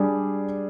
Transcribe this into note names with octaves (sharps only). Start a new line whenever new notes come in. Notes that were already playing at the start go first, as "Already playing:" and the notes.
Already playing: G3 D4 G#4